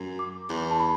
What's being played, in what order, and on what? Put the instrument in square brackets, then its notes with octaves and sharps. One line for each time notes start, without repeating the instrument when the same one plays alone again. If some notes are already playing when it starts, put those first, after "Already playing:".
Already playing: [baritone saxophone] F#2
[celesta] D6
[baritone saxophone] E2
[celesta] A5
B5